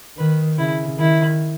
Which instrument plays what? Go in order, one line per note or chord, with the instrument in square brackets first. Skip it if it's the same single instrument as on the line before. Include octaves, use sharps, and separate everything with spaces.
[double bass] D#3 [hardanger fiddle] B4
[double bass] C#3 [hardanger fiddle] E4
[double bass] D#3 [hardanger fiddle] E4